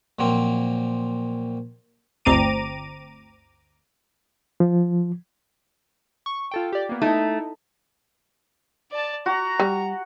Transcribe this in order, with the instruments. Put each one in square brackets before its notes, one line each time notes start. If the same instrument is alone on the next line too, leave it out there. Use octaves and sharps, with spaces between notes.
[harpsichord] A#2 F3 F#3 A#3 C4
[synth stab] G1 D2 C4 A#5 D6 D#7
[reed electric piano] F3
[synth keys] C#6
F4 A4 G5
G4 D5
A#3 B3
[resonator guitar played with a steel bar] A3 [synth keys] D#4 E4
[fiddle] D5 A5
[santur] F#4 [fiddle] A#5
[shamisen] G3